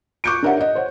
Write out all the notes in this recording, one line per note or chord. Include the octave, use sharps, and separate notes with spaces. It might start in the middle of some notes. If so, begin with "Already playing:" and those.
C#6 D6 F#6 G6 C#7 D7
D4 G4 A#4 C#5 E5 F#5
D#5
C5 C#5 F#5